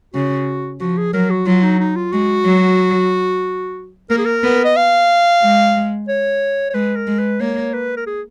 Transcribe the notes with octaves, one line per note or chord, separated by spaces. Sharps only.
C#3 F#4
F3 F#4
G#4
F#3 A#4
F#4
F#3 F4
D#4
D#4
F4
G#3 F#4
F#3
A#3 A#4
G#4
A#4
B3
D#5
F5
G#3
C#5
C#5
G#3 B4
A#4
G#3
B4
A#3 C#5
B4
A#4
G#4